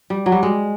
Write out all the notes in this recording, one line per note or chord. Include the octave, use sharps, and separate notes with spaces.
G3
F#3
G3
G#3